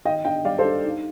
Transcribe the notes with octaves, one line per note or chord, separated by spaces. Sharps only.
D#3 D#5 G5
D4 D#5 G5
G3 D5 F5
A4 C5
D4
D#4